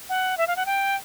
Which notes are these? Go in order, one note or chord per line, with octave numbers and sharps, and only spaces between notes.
F#5
E5
F5
F#5
G5